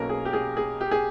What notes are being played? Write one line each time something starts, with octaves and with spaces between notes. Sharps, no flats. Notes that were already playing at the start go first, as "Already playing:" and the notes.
Already playing: B1 B2 A#3 C#4 A#4
G#4
G4
G#4
G#4
G4
G#4